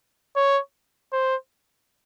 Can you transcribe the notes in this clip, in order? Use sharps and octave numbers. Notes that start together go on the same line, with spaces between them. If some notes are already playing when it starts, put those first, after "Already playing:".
C#5
C5